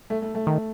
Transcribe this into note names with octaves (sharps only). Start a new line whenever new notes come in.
A3
A3
A3
D#3